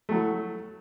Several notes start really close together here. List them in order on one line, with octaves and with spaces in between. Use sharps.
A3 F#3 E4